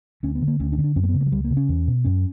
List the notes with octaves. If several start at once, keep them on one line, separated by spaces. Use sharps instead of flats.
D2 C#4
B3
D3
A#3
D2 C#4
D4
D3 C#4
D4
F#2 C#4
A#3
B3
C#3
A#3
F#3
C#2 G3
A#3
C#3
C#4
E2
B2
F#2 C#4